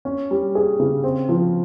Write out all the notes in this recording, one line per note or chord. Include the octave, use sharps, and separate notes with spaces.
C#4
G3
G#4
C#3
C4
F3